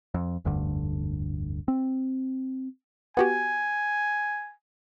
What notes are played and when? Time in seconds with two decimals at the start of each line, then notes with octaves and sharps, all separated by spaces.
0.14 F2
0.45 F1 D2 G2 D3
1.68 C4
3.17 B3 F#4 G4 G#5